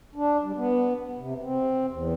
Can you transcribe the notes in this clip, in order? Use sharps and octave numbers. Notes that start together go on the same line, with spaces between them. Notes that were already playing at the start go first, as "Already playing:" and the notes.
D4
G3
B3
C3
C4
E2